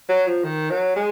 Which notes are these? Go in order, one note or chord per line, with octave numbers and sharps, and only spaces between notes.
F#3
F3
D#3
F#3
G#3